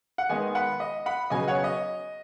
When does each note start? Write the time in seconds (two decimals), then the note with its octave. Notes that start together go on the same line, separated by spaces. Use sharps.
0.18 F#5
0.29 D#3 G#3 B3 D#5 G#5
0.55 F#5 B5
0.80 D#5
1.06 F#5 B5
1.30 C#3 F#3 B3 D#5 G#5
1.48 C#5 F#5
1.58 C#5
1.64 D#5